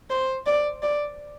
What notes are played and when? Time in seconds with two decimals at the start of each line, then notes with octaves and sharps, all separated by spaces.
0.10 C5
0.46 D5
0.82 D5